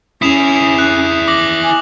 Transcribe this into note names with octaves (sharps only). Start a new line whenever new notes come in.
C#4 E4 G#4 D#6 E7 F7
F#6
D6 A#6 F#7
G#5